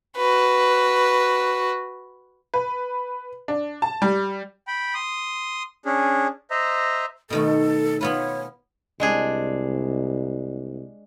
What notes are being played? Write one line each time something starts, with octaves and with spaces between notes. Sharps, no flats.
F#4 B4
B4
D4
A5
G3
G5 B5
C6 D#6
C#4 D4 G#4
C5 D#5 E5 A#5
B2 D#3 A3 A4
B3 F4 B4 C#5
C2 G#3 D4 G#4